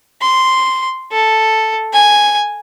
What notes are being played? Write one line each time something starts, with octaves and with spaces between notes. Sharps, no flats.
C6
A4
G#5